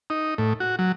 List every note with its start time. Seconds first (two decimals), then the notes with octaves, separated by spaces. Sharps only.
0.10 D#4
0.38 A2
0.60 F#4
0.79 F#3